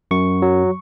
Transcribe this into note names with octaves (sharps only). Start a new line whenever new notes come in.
F#2 C#6
F#3